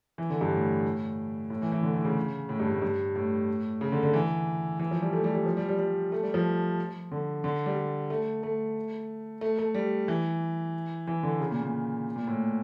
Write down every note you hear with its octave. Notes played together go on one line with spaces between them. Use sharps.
E3
D3
G2
A2
A2
E3
E3
D3
A2
C#3
A2
G2
A2
G2
A2
C#3
D3
D3
E3
E3
F3
G3
A3
G3
G3
F3
G3
G3
G3
A3
G3
F3
D3
D3
G3
G3
A3
A3
A3
A3
G3
E3
E3
D3
C#3
A#2
A#2
A#2
A2